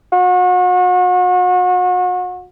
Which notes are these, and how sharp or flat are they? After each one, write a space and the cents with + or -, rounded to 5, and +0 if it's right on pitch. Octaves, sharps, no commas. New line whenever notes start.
F#4 -35